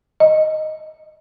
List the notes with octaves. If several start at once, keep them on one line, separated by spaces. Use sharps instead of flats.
D#5